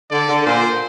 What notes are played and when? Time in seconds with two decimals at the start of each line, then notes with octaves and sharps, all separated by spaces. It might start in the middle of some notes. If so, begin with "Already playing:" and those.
0.10 D3 D5
0.29 D3
0.45 A#2 C5